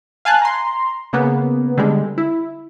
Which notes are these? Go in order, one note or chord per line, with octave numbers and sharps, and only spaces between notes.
F5 G#5 A5 F#6
A#5 C6
C#3 A#3 B3
D3 G3 G#3
E4